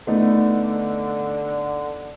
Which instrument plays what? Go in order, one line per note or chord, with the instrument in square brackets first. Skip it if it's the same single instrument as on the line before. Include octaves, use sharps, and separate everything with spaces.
[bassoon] D3 [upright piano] A3 B3 D#4